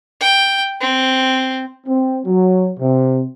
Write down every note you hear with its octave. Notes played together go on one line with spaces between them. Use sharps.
G5
C4
C4
F#3
C3